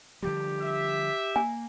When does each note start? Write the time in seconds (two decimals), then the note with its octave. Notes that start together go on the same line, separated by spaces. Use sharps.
0.22 D3 F3 G3 G4
0.62 E5
1.36 A#3 G#5